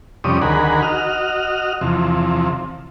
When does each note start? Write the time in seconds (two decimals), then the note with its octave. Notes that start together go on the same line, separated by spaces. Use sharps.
0.24 F2 C3 G3 C#4 D5 D#6
0.42 D2 D#3 G#4 A#4 F#5 B5
0.82 F#4 D#5 F6
1.81 E2 C3 F3